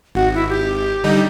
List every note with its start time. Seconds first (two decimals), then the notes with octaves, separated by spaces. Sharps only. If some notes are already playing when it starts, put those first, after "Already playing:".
0.15 G#1 F#4
0.34 E4
0.49 G4
1.04 D3 G3 D#4